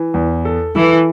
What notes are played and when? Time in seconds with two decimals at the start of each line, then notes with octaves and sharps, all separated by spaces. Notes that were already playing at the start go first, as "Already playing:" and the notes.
Already playing: E3
0.14 E2
0.45 A4
0.75 E3 A4